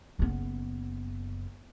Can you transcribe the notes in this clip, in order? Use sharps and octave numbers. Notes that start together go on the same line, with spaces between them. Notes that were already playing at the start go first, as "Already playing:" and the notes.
F#1 B3